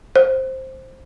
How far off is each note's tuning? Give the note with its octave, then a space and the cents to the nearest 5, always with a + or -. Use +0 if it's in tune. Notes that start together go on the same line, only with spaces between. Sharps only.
C5 +10